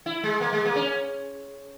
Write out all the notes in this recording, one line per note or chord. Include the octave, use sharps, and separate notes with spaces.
E4
G#3
A#3
G#3
A#3
C#4